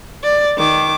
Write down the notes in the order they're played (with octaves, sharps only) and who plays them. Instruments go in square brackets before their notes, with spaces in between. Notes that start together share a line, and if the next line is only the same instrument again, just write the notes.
[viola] D5
D#3 D6